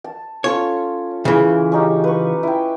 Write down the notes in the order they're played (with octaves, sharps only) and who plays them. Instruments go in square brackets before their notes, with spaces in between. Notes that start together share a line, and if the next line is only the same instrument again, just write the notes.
[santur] A5
[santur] C#4 F4 A4 [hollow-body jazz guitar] C#5
[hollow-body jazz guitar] C#3 E3 [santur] C#6
[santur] C#4 D#4 G4
B4 C#6
E4 G5